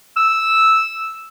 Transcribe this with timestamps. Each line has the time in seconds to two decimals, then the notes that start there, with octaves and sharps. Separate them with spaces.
0.17 E6